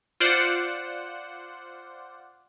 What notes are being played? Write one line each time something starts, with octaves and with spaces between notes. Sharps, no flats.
F4 C5 D5 F#5